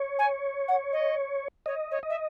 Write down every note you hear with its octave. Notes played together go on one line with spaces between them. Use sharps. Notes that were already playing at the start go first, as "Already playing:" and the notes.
Already playing: C#5
G#5
F#5
D#5
C#5 D#5
C#5
D#5
E5